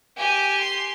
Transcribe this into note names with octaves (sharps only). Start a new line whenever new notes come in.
G4 G#5
C6